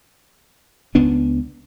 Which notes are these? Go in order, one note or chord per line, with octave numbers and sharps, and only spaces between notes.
C#2 B3 C#4 D4